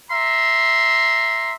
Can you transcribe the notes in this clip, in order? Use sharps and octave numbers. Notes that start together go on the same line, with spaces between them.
E5 A#5 C6